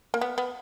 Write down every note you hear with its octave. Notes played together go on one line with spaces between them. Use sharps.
A#3
B3
B3